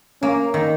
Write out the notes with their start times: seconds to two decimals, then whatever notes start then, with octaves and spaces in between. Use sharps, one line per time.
0.22 A#3 C#4
0.54 D#3